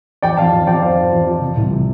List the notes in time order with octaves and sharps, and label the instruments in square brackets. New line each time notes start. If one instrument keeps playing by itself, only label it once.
[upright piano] F2 D5 G5
F2 F5 A5
F2
F2 D5 G5
F3 C5 F5
F2
F2
F3
C3
C2
C3